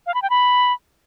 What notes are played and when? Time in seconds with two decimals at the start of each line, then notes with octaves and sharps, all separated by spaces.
0.07 F5
0.14 B5
0.22 G5
0.30 B5